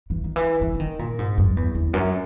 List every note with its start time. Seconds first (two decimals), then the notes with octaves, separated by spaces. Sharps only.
0.10 E3
0.24 D#3
0.36 E3
0.61 E3
0.74 E3
0.80 D#3
0.99 A#2
1.19 G#2
1.38 F#2
1.57 E2
1.75 E2
1.94 F#2